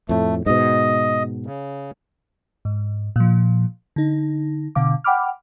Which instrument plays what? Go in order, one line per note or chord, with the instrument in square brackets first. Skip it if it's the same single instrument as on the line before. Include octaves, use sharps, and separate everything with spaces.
[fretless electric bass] F2 A2 [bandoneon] A3
[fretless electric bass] G#2 B2 [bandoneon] D#5
[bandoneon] C#3
[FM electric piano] G#2
A#2 F3
D3 D#4
B2 D3 F5 D6
F#5 G5 B5 D6 F6